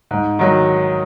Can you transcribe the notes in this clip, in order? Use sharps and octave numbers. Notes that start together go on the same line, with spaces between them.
G#2
D#3 F#3